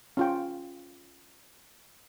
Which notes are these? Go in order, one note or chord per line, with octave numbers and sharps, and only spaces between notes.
C#4 F4 G5